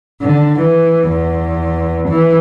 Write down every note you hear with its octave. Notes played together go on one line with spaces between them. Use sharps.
D3
E3
E2
E3